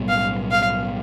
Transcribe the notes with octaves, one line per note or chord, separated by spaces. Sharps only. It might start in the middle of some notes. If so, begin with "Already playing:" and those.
Already playing: B1 A2 G3 B3
F5
F5